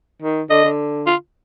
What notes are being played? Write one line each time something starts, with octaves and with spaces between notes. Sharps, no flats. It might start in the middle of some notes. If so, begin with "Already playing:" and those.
D#3
D3 D#5
D3
F4